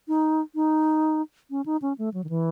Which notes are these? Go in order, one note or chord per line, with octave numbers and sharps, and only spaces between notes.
D#4
D#4
C#4
D#4
C#4
A3
F#3
D#3
E3